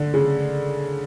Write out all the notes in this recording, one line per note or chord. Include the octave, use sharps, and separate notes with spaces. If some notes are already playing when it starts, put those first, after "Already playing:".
Already playing: D3
C#3